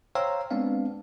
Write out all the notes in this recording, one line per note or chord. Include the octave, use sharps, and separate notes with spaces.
C5 C#5 F5 G5 A#5 E6
G#3 B3 C4 D4 F5